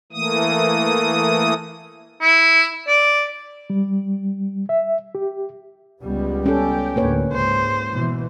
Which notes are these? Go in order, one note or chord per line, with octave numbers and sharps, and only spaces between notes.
E3 A3 A#3 D#6
E4
D5
G3
E5
G4
C#2 G3 B3
C#4 G4 A4 G5
D2 A2 A#3 B4 C#5
C#2 G#2 C5
B2 E3